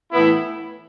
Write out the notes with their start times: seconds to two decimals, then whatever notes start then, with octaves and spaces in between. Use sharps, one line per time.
0.12 A2 E3 B3 E4